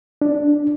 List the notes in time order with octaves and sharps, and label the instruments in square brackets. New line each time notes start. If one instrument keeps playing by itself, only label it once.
[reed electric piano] D4